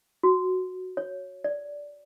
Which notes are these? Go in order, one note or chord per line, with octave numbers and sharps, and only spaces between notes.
F#4
C#5
D5